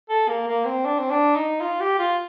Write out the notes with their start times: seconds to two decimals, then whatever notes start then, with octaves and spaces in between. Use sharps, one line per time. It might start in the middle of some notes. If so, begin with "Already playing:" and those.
0.09 A4
0.28 A#3
0.47 A#3
0.65 C4
0.85 D4
0.99 C4
1.10 D4
1.36 D#4
1.61 F4
1.80 G4
1.99 F4